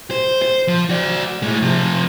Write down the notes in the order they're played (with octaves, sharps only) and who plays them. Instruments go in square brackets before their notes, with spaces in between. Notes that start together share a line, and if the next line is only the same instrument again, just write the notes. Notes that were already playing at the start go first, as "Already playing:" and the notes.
[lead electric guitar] C5
C5
F3
F#4 D5
A2 G#3
C3 F3